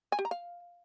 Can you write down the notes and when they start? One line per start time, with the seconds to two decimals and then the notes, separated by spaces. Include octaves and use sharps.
0.12 G#5
0.19 G4
0.25 A#5
0.31 F5